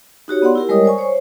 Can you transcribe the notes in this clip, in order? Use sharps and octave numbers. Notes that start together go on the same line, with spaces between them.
D#4 F#4 G4 C#5
B3 D5 F#5 C6
E4 G4 A#4
G3 G#3 A#4 C#5 D#5 D#6
C5 D5 G#5 C#6
C5 C#5